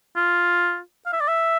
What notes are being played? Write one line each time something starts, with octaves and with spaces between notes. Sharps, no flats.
F4
F5
E5
D5
E5